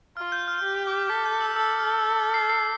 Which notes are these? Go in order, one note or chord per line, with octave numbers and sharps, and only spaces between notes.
F4 F6
G6
F6
G4
D6
A4 B6
G6
E6
A4 E6
F6
C7
C7